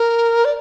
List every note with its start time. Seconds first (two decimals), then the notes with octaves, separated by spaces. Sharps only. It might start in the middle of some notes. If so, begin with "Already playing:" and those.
Already playing: A#4
0.45 D5